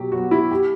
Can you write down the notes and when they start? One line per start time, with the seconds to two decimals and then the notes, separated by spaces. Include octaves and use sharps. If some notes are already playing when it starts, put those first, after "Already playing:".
Already playing: B2 F#3 G4
0.12 F#3 B3 F#4
0.31 E4
0.51 G4